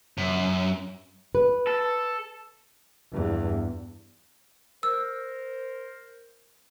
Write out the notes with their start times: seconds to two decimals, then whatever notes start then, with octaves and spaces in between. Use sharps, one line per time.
0.18 F#2
1.35 B4
1.67 A4
3.12 E2 G2
4.83 A#4 C5 E6